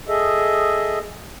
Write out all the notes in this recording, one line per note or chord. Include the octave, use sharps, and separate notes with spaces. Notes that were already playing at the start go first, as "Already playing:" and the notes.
G#4 A4 D#5 E5